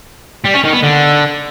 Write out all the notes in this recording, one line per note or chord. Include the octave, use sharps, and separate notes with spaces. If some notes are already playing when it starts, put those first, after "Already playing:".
G3
C#4
D#3
B3
D3